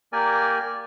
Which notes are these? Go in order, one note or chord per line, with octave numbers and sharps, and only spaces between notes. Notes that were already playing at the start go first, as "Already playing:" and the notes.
A#3 G4 A#4 D5 G#5